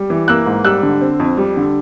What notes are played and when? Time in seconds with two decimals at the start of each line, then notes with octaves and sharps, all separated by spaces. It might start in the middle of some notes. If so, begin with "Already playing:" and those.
Already playing: G3
0.10 E3
0.28 A#3 E6 F#6
0.46 G#2
0.64 G3 E6 F#6
0.83 D3
1.01 C4
1.20 F2
1.38 G3
1.57 D3